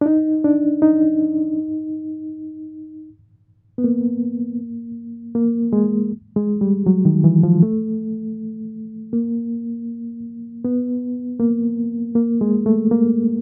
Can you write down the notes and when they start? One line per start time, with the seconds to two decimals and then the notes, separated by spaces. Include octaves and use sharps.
0.01 D4
0.06 D#4
0.44 D4
0.82 D#4
3.78 B3
3.84 A#3
5.35 A#3
5.73 G#3
6.36 G#3
6.61 G3
6.86 F#3
7.05 D#3
7.24 E3
7.43 F3
7.63 A3
9.13 A#3
10.65 B3
11.40 A#3
12.15 A#3
12.41 G#3
12.66 A3
12.91 A#3